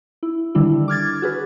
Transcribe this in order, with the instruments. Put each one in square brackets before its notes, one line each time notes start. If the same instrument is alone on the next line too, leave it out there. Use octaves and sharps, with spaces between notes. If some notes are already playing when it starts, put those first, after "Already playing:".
[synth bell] E4
D3 D#3 G3 D4 E4
D6 F6 G#6 A6
F#4 G#4 B4